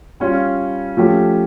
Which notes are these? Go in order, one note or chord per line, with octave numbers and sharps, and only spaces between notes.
G3 C#4 F4
F3 A3 C#4 G4